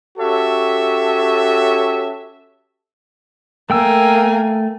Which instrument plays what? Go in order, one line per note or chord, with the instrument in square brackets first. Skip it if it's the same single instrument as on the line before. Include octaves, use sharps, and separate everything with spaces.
[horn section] C#4 F#4 G4 A4 C#5 E5
[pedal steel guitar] A3 G5 E6 [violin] A#3 G#5